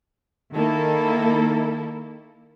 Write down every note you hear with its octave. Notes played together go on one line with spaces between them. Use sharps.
D#3 A#3 E4 A4